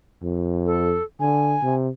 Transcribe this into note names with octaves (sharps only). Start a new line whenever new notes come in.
F2
A4
D3 G#5
C3